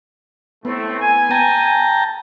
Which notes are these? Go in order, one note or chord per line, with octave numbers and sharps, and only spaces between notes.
A2 A3 B3 C4
G#5
G5 A5 A#5